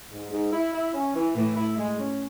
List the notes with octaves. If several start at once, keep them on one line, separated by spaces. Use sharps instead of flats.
G#2
G#2
E4
E4
C#4
E3
A2 E3
E4
G#3
C#4